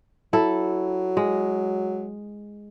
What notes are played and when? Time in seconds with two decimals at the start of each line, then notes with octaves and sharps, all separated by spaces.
0.33 F#3 E4 A4
1.17 G#3